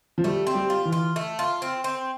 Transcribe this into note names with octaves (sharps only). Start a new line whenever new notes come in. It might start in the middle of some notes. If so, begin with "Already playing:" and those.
F3
G3 A3
C4
G3
F4
E3
F4
A3
F4
C4
C4